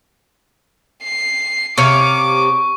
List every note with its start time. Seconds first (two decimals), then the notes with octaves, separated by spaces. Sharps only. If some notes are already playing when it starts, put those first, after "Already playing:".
1.03 C7
1.78 C3 C#5 F5 C#6 D6